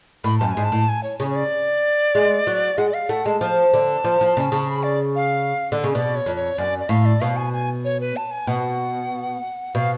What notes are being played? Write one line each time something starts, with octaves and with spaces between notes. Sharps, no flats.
A2 B5
F#2 A5
G#5
G#2
A5
A2
G#5
C#5
C#3 C#5
C#5
D5
G#3
F#3
G#3 F#5
D5
F5
A3 F#5
G#3 A5
F3 A5
D3
F3
F3
C#3
C#3
B5
D5
F5
D3
C#3
B2 D5
C#5
F2
C#5
F#2 D5
D5
A2 F5
D5
B2 F5
G#5
G#5
C#5
B4
A5
G#5
B2 F#5
B2 F5